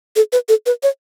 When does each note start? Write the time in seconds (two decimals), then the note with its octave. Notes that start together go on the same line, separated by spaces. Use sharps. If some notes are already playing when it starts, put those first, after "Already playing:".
0.16 A4
0.33 B4
0.49 A4
0.66 B4
0.83 C#5